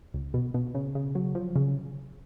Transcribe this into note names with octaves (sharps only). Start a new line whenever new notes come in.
C#2
B2
B2
C#3
C#3
F#3
F3
C#3